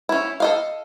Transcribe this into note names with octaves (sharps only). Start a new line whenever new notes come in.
C#4 E4
A4 D#5 F5